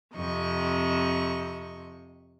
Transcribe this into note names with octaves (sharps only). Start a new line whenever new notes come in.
F2 C3 D#5 C#6